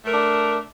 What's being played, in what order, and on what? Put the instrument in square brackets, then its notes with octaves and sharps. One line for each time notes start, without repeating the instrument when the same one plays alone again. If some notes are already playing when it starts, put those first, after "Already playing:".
[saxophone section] A3
A#4
D4